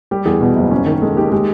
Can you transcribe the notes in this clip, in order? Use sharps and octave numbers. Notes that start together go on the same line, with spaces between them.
G3 G4
E2 G#4
B2
F#1
C#4
D#3
G#3 A4
D#2 G4
G#3 G4